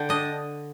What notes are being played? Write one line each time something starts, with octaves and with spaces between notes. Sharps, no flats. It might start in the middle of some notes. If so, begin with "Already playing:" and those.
Already playing: D3 G5
D4 D#5